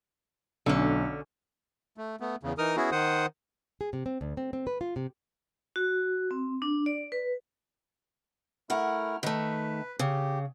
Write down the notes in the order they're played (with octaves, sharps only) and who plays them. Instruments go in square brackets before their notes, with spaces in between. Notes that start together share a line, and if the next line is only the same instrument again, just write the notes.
[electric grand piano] B1 [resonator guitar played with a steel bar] D3 C#4
[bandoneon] A3
A3 B3
E2 C#3
E3 D#4 A#4 D#6 F6
B3 C#4 E4 F#4 G#4
D#3 C5 F#5 D#6
[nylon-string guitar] G#4
C3
C4
D2
C4
C4
B4
F4
C3
[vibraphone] F#4
C4
D4
D5
B4
[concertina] A3 E4 F6 [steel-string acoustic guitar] A#4 F#5
[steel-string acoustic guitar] D#3 A3 [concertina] B4
[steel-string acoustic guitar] C#3 [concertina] G4